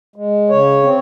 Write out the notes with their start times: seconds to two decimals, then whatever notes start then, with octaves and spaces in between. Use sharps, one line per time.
0.16 G#3
0.49 C#3 C#5
0.83 C4